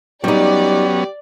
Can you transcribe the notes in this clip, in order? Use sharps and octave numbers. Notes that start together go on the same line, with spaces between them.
F#3 G3 B3 C#4 D#4 G4 D5